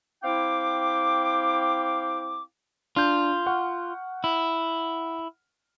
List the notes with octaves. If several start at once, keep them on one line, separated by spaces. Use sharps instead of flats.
C4 E4 F5 G5 D6
D4 F4 G6
F#5 C#6 F6
E4